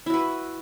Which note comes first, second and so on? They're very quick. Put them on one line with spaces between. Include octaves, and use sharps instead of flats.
E4 F#4 B4